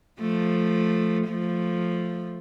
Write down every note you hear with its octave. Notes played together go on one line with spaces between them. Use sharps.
F3 A3
F3 A3